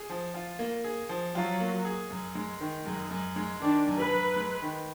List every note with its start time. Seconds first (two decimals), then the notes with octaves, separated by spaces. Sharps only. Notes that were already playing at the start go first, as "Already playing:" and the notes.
Already playing: G#4
0.09 F3
0.34 F4
0.59 A#3
0.84 G#4
1.09 F3
1.34 F#3 F4
1.60 A#3
1.85 G#4
2.11 F#2
2.35 G#3
2.61 D#3
2.86 F#2 G#3
3.11 F#2
3.36 G#3
3.61 D#3 D4
3.87 F#2
3.99 B4
4.11 F#2
4.36 G#3
4.62 D#3